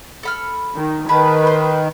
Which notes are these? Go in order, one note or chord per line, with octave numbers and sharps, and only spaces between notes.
A4 B5 F6
D#3
D#3 G#4 B4 A5 B5
C5